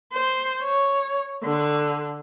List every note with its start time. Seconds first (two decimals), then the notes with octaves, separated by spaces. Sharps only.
0.13 C5
0.63 C#5
1.43 D3